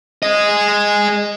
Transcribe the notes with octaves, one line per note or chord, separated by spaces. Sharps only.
G#4 D#5